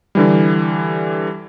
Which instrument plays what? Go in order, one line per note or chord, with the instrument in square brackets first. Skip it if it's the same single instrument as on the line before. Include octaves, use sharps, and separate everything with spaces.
[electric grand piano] D3 E3 G3